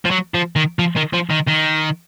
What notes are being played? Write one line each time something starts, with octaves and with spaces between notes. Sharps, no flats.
F3
F#3
F3
D#3
F3
D#3
F3
D#3
D#3